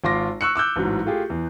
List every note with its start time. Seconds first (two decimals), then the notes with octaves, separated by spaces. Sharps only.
0.04 G#1 F4 C6 D6 A#6
0.41 C#6 E6 F#6 C#7
0.56 D6 E6 F#6 G6
0.76 A1 G#2 F#3
1.06 A3 F4 G4 G#4
1.30 E2